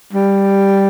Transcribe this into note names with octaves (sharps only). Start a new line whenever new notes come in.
G3